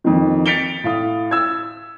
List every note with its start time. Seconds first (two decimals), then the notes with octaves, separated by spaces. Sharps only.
0.04 F2 D#3
0.46 A6 B6 C#7 D7 F7 G7
0.84 A2 F5 D#6
1.31 E6 G#6